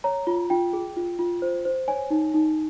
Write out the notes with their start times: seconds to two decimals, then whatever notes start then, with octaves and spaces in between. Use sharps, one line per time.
0.04 C#5 A#5
0.27 F4
0.50 F4 G5
0.73 G#4
0.96 F4
1.19 F4
1.42 C5
1.65 C5
1.88 C#5 G#5
2.10 D#4
2.34 D#4